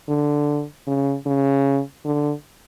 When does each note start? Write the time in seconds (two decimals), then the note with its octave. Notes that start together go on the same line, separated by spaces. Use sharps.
0.09 D3
0.87 C#3
1.26 C#3
2.05 D3